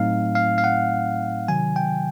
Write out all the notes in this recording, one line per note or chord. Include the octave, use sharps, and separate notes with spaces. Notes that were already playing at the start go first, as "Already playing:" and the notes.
Already playing: A2 F#3 A3 C4 D#4 F5
F5
F5
F#5
C3 D#3 F#3 G#5
G5